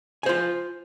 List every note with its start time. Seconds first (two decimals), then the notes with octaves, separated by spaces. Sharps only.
0.23 G#5
0.26 C5
0.29 F4